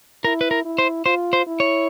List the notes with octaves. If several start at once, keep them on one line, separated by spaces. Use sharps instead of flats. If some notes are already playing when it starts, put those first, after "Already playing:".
E4 A#4
B4
A#4
E4
C5
F4 C5
C5
E4
C#5